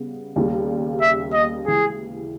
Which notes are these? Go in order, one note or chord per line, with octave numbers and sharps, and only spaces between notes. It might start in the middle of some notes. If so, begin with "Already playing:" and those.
Already playing: C#3 G3 B3
D#2 C#3 G3 A#3
E5
D#5
C#3 E3 G#3 G#4